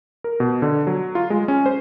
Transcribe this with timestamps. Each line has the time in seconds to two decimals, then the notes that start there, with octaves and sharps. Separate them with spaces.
0.24 A#4
0.40 B2
0.62 D3
0.87 F#3
1.15 F4
1.30 G#3
1.48 C#4
1.66 C5